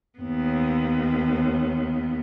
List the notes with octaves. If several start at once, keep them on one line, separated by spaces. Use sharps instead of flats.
D#2 B3